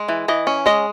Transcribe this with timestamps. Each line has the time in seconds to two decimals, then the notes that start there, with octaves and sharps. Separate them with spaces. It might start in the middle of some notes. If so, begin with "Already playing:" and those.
Already playing: G#3
0.09 E3
0.28 E3 D#5
0.47 C#4
0.66 G#3 D#5